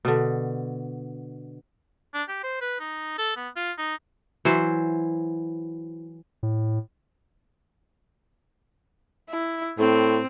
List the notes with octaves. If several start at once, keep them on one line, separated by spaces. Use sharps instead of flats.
B2 D3
D4
G4
C5
B4
D#4
A4
B3
F4
D#4
E3 F#3 E4 C5
A2
E4
A2 C4